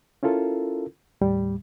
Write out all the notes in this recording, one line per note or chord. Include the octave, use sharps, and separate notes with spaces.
C#4 E4 F4 A4 A#4
D#2 A2 G3